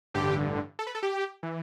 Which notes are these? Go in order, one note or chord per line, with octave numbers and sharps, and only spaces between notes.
A1 G2 D3 G4
A4
B4
A4
G4
E3